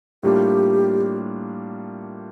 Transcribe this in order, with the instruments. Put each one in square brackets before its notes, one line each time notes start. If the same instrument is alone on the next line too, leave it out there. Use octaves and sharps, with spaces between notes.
[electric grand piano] A2 G3 A#3 D4 F4 [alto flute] G4